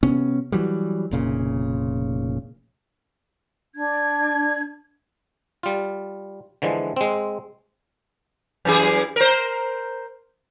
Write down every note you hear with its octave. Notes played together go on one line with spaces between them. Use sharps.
C3 B3 C#4
E3 F#3 G3
F1 A#2 C#3
D4 G#6
G3 F4
D3 E3 F3 G#3
G#3 C4
F#2 E3 G#4
A#4 C5